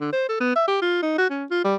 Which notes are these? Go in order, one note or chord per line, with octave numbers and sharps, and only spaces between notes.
D3
C5
A4
B3
E5
G4
F4
D#4
F#4
C#4
F4
G3